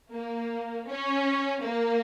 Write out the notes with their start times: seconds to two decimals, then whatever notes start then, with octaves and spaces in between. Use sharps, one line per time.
0.15 A#3
0.89 C#4
1.63 A#3